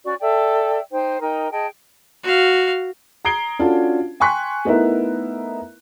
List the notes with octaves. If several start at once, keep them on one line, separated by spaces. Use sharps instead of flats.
C#4 F#4 D5 C#6
A4 D5 E5 G5
D#4 C5 G5
D#4 A#4 D#5 G5
G#4 D#5 G5 A5
F#4 F5
A#5 D#6 G#6 C7 D7 G7
C#4 D4 F4 F#4 A4 A5
G5 G#5 C6 C#6 F#6 B6
A3 B3 D#4 E4 A#4 E5